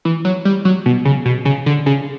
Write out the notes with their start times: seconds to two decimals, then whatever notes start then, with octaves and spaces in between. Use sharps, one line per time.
0.05 E3
0.25 F#3
0.45 G3
0.65 F#3
0.86 B2
1.05 C#3
1.26 B2
1.45 C#3
1.66 D3
1.86 C#3